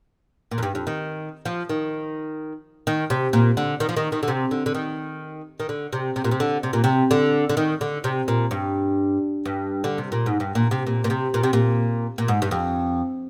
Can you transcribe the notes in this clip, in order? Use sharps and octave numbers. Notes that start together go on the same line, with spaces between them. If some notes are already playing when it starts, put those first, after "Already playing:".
A#2
F2
G2
F2
D#3
F3
D#3
D#3
C3
A#2
D3
D#3
F3
D#3
D#3
D3
C3
D3
D3
D#3
D#3
D3
C3
C3
A#2
C3
D3
C3
A#2
C3
D3
D3
D#3
D3
C3
A#2
G2
G2
D3
C3
A#2
G#2
G2
A#2
C3
A#2
A#2
C3
A#2
C3
A#2
A#2
G#2
G2
F2